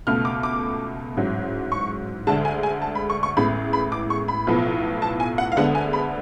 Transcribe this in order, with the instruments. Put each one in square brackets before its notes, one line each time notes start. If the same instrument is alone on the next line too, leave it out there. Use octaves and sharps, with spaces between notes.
[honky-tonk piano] C#2 B2 A3 F6
D6
D6
A1 G#2 F#3
C#6
D2 D3 G#3 A5
G#5
G#5
A5
B5
C#6
C#6
A1 A2 G#3 B3 B5
B5
D6
C#6
B5
B1 A2 F3 B3
A5
G#5
F#5
F5
D2 D3 G#3 B3 F#5
G#5
B5